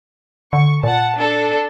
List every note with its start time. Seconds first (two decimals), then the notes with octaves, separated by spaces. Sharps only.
0.53 D3 C#6
0.84 A#2 F#5 A5
1.18 D4 A4